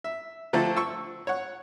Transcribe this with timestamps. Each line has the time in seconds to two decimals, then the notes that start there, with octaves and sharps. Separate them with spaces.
0.04 E5
0.53 D3 F3 A3 C4 A4
0.77 C#6 E6
1.27 C#5 F#5